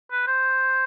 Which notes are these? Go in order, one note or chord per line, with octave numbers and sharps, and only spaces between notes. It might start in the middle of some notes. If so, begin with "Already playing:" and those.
B4
C5